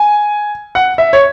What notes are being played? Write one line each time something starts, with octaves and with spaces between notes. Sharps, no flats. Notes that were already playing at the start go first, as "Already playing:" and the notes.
Already playing: G#5
F#5
E5
C#5